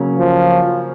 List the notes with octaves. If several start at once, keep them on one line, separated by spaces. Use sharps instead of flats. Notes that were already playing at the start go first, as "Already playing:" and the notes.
Already playing: C#3 F#3 A#3 C#4
F3